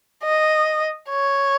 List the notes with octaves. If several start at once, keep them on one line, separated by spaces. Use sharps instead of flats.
D#5
C#5